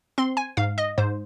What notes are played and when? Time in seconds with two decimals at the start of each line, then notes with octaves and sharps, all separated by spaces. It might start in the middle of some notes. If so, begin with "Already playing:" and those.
0.18 C4 C6
0.37 G#5
0.57 G#2 F5
0.78 D#5
0.98 G#2 C5